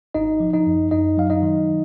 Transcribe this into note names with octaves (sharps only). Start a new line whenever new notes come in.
G#1 D#4 D#5
F3
D#4 D#5
F#2
F#2 D#4 D#5
F#3 F5
D#4 D#5
D#3